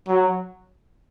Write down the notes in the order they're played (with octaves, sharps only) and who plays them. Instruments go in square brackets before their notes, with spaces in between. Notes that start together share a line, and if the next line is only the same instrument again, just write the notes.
[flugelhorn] F#3